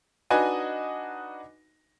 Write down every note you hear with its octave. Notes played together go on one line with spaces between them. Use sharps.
D4 D#4 F#4 B4 D#5 G#5